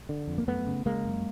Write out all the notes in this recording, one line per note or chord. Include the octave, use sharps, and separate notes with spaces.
D3
F2
A#3
F#2 A3 B3
C#3
C#3 G#3 A#3
F#2